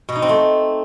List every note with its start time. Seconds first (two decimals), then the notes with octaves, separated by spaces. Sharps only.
0.09 B2
0.15 D#4
0.22 C4
0.29 A3